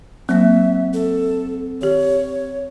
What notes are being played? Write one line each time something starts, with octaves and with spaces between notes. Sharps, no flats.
F#3 A#3 C4 E5
A4
D#3 G4 C#5